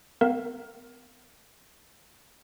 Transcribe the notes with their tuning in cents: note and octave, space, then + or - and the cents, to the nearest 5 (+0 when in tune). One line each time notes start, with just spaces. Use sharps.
B3 +35 A#4 +0 F5 +0